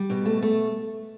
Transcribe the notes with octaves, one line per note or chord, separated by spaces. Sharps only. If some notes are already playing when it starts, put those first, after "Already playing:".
Already playing: G3
B2
A3
A3